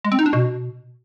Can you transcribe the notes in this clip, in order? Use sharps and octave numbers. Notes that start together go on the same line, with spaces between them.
G#3
C4
D#4
D4
B2